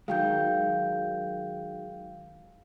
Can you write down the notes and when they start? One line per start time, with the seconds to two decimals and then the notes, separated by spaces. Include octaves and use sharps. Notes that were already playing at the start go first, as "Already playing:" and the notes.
0.08 D#3 F#3 G#3 F5 G5 G6